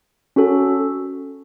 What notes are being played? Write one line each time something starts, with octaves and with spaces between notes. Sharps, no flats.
C#4 F#4 A4